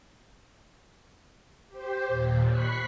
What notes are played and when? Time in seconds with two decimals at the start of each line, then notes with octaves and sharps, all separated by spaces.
1.68 G4 C5
2.07 D#2 A#2
2.50 B5 C#6 F#6 B6 C7